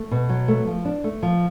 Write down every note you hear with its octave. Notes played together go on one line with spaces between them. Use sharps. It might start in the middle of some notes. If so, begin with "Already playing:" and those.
Already playing: A3
B2
F#3
A3
F3
D4
A3
F3